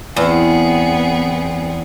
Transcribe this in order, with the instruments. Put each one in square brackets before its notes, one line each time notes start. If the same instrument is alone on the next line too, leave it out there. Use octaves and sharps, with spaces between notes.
[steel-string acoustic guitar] E2 [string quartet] B3 C4 G#4